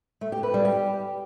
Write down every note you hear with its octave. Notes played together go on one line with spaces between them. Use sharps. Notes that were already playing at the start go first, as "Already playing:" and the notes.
A3
G4
B4
G3
G4